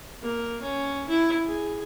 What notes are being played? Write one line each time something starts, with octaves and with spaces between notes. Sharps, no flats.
A#3
C#4
E4
G#4